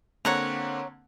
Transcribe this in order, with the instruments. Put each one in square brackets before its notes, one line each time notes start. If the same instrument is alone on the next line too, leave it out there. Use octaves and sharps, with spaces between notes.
[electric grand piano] D3 A#3 C4 [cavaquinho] C#5 F#5 A#5